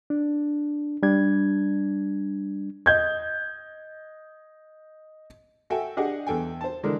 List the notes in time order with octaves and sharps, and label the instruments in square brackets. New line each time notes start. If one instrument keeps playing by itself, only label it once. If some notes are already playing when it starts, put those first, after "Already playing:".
[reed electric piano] D4
G3 D4 G#6
[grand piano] D#5 G6 G#6
[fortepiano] F#4 A4 E5 G5 G#5
D4 G4 G#4 D#5 F#5
E2 A4 G5 G#5
C5 A5
D3 E3 G#3 D4 A#4